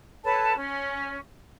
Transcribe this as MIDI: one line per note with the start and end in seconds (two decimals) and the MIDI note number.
0.24 0.53 69
0.24 0.53 71
0.24 0.53 73
0.24 0.53 81
0.56 1.17 61